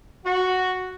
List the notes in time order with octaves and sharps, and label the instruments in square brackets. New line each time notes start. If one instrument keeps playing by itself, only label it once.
[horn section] F#4